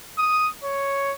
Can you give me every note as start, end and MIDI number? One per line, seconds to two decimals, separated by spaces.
0.18 0.48 87
0.64 1.13 73